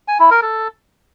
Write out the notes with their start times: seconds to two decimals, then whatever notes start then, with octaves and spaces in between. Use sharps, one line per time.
0.08 G#5
0.19 E4
0.31 A#4
0.42 A4